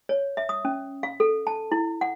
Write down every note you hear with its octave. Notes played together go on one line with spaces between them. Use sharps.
C#5
E5
D#6
C#4
F5
A4
A5
E4
F#5